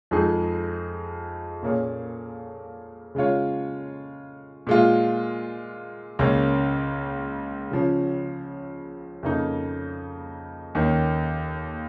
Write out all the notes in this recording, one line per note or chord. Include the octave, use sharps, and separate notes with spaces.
F2 F3 G#3 D#4 G#4
A#2 A#3 C#4 G#4 C#5
C#3 G#3 F4 C#5
A#2 G#3 F4
C#2 C#3 A#3 C#4
C#3 F3 C#4
F2 C#3 A#3 D#4
D#2 D#3 A#3 C#4